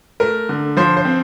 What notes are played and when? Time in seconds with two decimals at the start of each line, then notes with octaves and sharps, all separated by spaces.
0.20 A3 A#4
0.49 D3
0.77 F3 C5
0.97 C5
1.05 C4